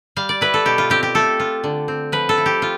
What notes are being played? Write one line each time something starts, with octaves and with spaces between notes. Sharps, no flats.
G3 F5
D5
E4 B4
A4
B2 G4
F4
C4 G4
G4
A3 A4
F4
D3
C4
F3 B4
A4
E4
G4
F4